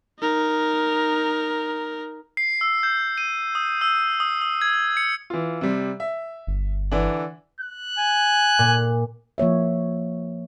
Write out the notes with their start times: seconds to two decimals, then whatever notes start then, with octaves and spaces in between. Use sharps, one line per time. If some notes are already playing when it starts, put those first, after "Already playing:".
0.19 D#4 A#4
2.37 C7
2.61 E6
2.83 G6
3.18 D#7
3.55 D#6
3.81 E6
4.20 D#6
4.42 D#6
4.61 G#6
4.97 C#7
5.30 E3 F4
5.61 C3 G3
6.00 E5
6.47 G1
6.92 D3 E3 D4
7.60 F#6
7.97 G#5
8.59 A#2
9.38 F3 A#3 C#5 E5